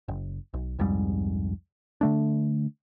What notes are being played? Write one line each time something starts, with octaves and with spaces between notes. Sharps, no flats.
F#1
B1
C2 F2 G#2 G3
D3 A3 D4